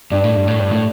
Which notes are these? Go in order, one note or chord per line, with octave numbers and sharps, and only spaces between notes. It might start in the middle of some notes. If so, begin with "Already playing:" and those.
G2 D4 D5
A2
G2
A2
G2
A2